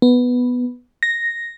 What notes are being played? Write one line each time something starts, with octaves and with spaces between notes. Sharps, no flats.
B3
A#6